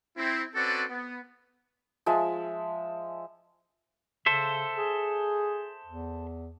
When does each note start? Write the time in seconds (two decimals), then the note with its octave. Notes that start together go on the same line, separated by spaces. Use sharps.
0.17 C4 E4
0.55 C4 C#4 F#4 A4 B4 D5
0.89 B3
2.06 F3 G#3 E5
4.26 C#3 A4 C5 E5
4.77 G#4
5.86 E2